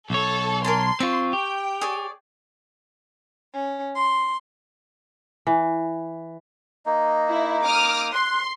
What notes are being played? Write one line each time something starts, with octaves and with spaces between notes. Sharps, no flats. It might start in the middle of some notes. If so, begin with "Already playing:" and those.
B1 A4 C#5
A#4 G#5 A5 C6
C4 F4 C#6
G4 G5
G#4 C#5 D5
C#4
C6
E3
A#3 D#4 D#5
E4
D6 D#6 F6
C6 F#6